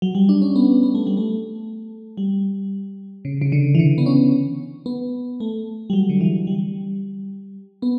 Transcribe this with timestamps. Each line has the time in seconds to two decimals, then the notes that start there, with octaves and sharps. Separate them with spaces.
0.02 F#3
0.15 G3
0.29 D4
0.42 C#4
0.56 B3
0.83 B3
0.95 A3
1.07 G3
1.17 A3
2.17 G3
3.25 C#3
3.41 C#3
3.52 D3
3.75 E3
3.79 D3
3.98 B3
4.06 C#4
4.86 B3
5.40 A3
5.90 G3
5.93 F#3
6.09 D3
6.21 E3
6.47 G3
7.82 B3